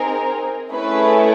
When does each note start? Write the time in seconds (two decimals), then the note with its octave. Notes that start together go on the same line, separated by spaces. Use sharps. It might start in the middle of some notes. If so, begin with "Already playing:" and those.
Already playing: C4 D#4 G#4 A#4
0.72 A3 C#4 E4 G#4 B4